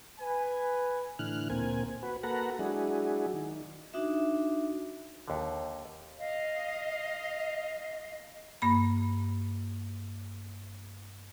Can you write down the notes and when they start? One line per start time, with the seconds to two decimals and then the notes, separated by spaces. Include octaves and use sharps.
0.20 B4 G#5
1.19 A2 D3 E3 F6 F#6
1.50 D2 A#2 A#3 C4 G#5
2.03 F#4 B4
2.23 A#3 F#4 A4 B4 F#5 A#5
2.59 F#3 G#3 D4 E4 F#4 G#4
3.34 D#3
3.94 D4 D#4 F#4 E5
5.28 D#2 D3
6.18 D#5 F5
8.62 G2 A#3 B5